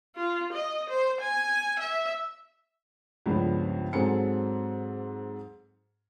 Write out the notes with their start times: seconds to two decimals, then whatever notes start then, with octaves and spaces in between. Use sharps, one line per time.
0.16 F4
0.53 D#5
0.89 C5
1.21 G#5
1.79 E5
3.26 C#2 G2 F3 G3 B3 C#4
3.93 G#2 F#3 C4 A4 G#5 C#7